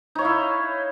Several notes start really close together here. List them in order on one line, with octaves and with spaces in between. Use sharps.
D#4 C#5 F5 E4